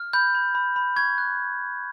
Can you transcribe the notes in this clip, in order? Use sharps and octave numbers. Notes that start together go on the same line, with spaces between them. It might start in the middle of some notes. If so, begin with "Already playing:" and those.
Already playing: F6
B5 G6
B5
B5
B5
C#6 G#6
F#6